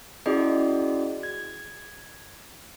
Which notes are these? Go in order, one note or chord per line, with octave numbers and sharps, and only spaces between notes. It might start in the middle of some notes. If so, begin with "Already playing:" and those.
C#4 E4 F#4 G#4 D5 D#5
G#6